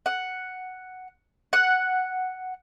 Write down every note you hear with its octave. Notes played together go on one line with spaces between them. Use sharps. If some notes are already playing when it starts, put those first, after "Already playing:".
F#5
F#5